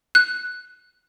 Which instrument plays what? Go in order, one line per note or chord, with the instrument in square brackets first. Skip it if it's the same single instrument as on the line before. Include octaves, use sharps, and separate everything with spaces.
[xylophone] F#6